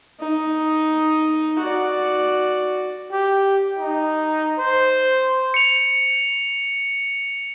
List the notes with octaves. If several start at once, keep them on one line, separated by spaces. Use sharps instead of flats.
D#4
F#4 D5
G4
D#4
C5
C#7 F7